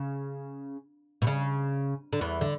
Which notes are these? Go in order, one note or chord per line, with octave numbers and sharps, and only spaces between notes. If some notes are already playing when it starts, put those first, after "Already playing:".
Already playing: C#3
B2
C#3
D3
E2 E3
D3